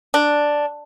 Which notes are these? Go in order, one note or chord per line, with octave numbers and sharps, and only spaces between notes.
D4